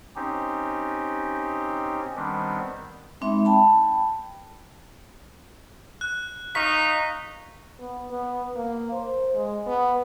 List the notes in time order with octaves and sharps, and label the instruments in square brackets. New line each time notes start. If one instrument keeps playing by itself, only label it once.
[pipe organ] C4 C#4 D#4 G4
D#3 G3 B3 C4 D4
[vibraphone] G#3 C4 D#4 E5 B5
G5 A5 B5
[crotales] F#6
[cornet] D#4 [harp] F5 C#6 [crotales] B6
[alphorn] B3
B3
A#3
C5
G#3
B3